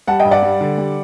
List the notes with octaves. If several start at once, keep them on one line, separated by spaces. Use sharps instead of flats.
G3 F#5 A5
D#5 G5
G2
D5 F#5
G3
D3
G3